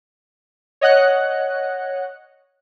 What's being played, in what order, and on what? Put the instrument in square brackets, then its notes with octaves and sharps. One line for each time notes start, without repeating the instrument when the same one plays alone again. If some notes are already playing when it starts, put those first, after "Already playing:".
[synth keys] C#5 D#5 F#5 F#6